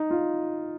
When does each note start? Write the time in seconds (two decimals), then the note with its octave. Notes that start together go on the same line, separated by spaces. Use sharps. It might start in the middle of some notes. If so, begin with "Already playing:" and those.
Already playing: D#4
0.11 F4